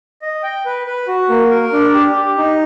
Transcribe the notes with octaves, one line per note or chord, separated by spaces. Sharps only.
D#5
G5
B4
B4
F#4
A#3
A#4
D4
G4
G4
D#4